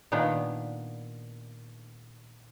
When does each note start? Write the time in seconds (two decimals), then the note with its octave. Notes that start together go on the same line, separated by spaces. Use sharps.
0.12 A#2 D#3 B3 D4